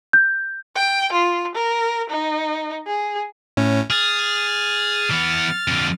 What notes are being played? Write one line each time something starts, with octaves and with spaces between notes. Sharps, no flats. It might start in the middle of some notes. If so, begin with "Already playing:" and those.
G6
G5
F4
A#4
D#4
G#4
A2 C#4
G#4 F6 A6
E3 B3
F2 D3